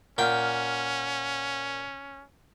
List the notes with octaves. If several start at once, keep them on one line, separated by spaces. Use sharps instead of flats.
A#2 C#4 F#5 G5 F6